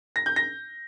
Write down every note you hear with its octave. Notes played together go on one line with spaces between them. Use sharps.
A#6
G6
A#6